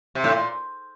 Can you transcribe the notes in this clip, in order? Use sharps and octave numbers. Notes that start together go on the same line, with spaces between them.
C3
A2
A#2